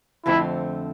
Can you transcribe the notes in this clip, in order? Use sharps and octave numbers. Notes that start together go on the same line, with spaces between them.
F2 D3 F3 A3 C4 E4